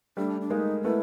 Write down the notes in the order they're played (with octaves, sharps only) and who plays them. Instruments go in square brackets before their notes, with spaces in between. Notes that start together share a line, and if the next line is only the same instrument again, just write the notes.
[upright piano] G3 A3 [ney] D4
[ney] D4
[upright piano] G#3 A#3 [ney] D#4
[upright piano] A3 B3 [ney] E4